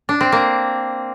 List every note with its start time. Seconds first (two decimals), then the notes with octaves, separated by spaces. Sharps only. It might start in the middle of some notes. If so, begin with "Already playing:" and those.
0.09 D4
0.21 C4
0.32 A#3